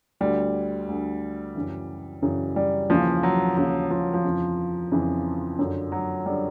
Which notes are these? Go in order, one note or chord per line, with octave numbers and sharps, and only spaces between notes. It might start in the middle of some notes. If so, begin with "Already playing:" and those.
D2 D3 G3
D2 D3
F#2 C#3 E3
F#2 C#3 E3
G3
D#2 C#3 E3 F3
F#3
D#2 C#3 E3 F#3
F3
F3
F2 C#3 E3
F2 C#3 E3
F#2 D3
F#3
D3 G3